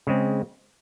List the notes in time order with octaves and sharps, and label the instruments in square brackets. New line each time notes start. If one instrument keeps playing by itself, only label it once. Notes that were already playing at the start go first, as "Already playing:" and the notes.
[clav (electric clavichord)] C#3 G#3 C4